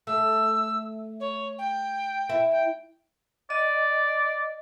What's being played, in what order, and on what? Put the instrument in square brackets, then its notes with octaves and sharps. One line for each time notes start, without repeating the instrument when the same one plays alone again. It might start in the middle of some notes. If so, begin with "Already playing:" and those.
[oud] A3 [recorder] E6
[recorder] C#5
G5
[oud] E4
[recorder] G5
[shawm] D5 [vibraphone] D#5